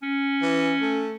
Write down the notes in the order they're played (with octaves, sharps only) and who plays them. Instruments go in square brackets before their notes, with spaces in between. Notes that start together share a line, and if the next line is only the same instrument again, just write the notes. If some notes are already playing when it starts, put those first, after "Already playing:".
[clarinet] C#4
[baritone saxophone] E3
A3